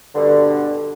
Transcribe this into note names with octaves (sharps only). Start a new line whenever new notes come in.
G2 B2 D3